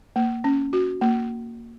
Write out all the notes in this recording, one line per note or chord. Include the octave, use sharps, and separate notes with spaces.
A#3
C#4
F#4
A#3